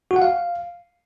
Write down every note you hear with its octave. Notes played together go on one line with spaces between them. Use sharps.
F#4
F#5
F5